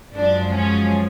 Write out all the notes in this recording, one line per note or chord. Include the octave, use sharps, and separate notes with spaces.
F#2 F3 G#3 D4
C#4